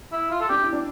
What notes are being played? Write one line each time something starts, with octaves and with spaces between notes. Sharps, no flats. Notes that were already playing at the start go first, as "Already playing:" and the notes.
E4
F4
A4
D4 G4
E4
D4